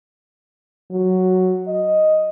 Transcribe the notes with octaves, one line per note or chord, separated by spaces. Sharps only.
F#3
D#5